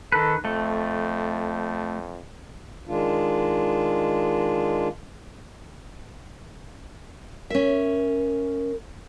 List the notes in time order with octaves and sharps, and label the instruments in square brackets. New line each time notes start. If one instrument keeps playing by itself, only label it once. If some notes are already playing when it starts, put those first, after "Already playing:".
[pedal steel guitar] D#3 B4 [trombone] A4
[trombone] F2 [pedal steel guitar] A3
[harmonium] D#3 G#3 D4 F4
[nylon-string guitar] C#4 E5 [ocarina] A#4